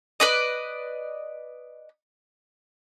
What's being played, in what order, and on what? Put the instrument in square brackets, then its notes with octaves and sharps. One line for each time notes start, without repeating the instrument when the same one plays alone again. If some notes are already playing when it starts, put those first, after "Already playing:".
[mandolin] B4 D5 D#5